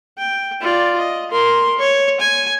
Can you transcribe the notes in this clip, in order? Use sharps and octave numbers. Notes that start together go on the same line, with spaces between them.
G5
F4 D5
D#5
A#4 C6
C#5
G#5